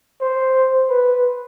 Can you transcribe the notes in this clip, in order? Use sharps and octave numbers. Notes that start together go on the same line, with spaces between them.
C5
B4